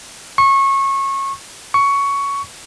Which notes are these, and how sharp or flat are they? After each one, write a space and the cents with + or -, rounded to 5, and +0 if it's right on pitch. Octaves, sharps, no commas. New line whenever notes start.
C#6 -25
C#6 +10